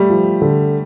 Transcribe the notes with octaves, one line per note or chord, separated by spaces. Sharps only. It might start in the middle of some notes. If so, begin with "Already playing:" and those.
Already playing: G3 A3
F3
D3